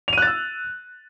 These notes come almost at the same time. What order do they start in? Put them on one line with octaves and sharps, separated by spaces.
F7 D#7 F#6 A6 E6